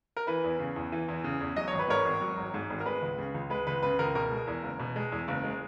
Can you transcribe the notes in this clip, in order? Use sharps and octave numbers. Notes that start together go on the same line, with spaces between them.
A#4
E3 B4
E2
C#3
E2
E3
E2
C#3
E2
F#3 D#5
G#1 C#5
B4
G#2 A#4 C#5
G#1
F#3
G#1
G#2
G#1
A#4
G#3 B4
C#2
C#3
C#2
G#3 B4
C#2 B4
C#3 B4
C#2 A#4
B2 A#4
G#3
E2
F#1
B2
G#3
E2
F#1
G#3